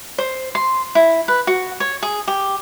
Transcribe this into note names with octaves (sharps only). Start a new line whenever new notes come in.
C5
C6
E4
B4
F#4
C#5
G#4
G4